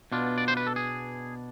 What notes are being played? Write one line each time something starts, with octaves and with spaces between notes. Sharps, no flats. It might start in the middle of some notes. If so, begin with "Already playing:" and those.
B2 B3 D4 F4
D5
C5
B4
A4
G#4